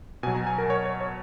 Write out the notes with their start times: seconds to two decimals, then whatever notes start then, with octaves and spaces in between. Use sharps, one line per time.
0.23 B2 G#5
0.27 F#3
0.35 A#5
0.47 G#5
0.58 A#4
0.70 C#5
0.85 C#5
1.01 C#5